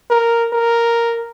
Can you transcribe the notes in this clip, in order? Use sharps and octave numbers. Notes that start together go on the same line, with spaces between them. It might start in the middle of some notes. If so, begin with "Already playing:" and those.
A#4
A#4